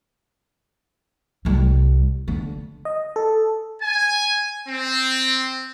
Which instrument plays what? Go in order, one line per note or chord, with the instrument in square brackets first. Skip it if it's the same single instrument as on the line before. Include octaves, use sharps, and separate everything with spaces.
[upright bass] C2 G3
D3
[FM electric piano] D#5
A4
[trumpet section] G#5
C4